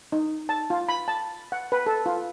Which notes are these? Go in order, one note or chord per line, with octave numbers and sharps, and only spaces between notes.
D#4
A5
F4
B5
A5
F#5
B4
A4
F4